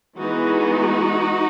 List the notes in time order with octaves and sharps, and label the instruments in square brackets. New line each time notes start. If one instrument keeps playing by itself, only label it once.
[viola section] E3 G#3 B3 D#4 F#4